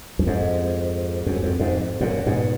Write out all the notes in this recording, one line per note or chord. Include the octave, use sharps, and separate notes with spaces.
F#2
F2 G#2
F#2
F2
F2 G#2
F#2 A#2
G#2 B2